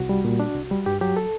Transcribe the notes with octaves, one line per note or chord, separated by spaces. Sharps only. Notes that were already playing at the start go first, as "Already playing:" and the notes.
Already playing: C2 F#4
G3
A#2
D4
C2
G3
G2 G4
F#3 G4
A4